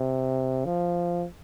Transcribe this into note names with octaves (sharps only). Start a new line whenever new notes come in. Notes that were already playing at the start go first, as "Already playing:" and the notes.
Already playing: C3
F3